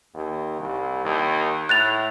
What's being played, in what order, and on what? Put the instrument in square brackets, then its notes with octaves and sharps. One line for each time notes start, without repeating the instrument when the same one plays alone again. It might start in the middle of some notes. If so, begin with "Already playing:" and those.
[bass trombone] D#2
C2
D#2
[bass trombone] A2 [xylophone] F#6 A6 F7